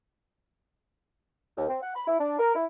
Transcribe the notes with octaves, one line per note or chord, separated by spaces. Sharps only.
D#2
C4
F#5
B5
E4
D4
A#4
E4